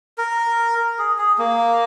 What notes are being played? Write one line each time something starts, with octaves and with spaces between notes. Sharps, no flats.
A#4
G#4
G#4
A#3